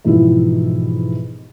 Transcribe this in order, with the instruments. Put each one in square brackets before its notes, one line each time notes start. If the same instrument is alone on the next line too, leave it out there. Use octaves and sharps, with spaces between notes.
[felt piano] G#2 B2 E3 F3 E4 G4